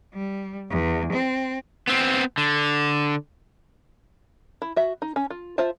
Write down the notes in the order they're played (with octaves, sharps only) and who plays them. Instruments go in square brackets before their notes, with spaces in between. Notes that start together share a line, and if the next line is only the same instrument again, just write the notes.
[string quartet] G3
E2
C4
[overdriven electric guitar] B3 C4
D3
[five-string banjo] E4
F#4 E5
D#4
C#4
F4
F4 C5 E5 A5